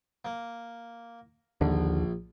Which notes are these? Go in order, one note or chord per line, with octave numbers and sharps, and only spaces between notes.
A#3
A#1 D#2 D3